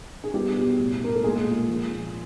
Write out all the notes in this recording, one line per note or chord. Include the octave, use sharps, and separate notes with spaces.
G#4
G3 B3 G4
B2
A2
A2 A#4
A4
G#3 A#3 G#4
A#2
F3
A#2